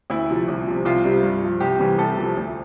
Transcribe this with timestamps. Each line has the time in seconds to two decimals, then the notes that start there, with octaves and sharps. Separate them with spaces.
0.10 D2 E4
0.30 C3 F3
0.48 C2
0.67 C3 F3
0.85 C2 F4
1.05 C3 G3
1.23 G2
1.43 F3
1.60 C2 G4
1.79 C3 E3 G3
1.98 C2 A4
2.17 C3 F3
2.37 D2